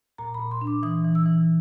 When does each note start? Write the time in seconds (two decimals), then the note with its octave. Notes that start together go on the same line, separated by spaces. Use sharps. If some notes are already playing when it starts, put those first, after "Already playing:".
0.18 A#2 A#5
0.34 B5
0.40 A#2
0.51 C6
0.61 D4
0.67 D6
0.83 E3 D#6
1.05 E3
1.15 E6
1.26 E3